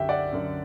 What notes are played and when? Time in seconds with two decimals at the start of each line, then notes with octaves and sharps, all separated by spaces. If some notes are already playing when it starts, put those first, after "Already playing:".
Already playing: F#2 D3 G4 E5 G5
0.09 D5 F#5
0.32 F#2 D3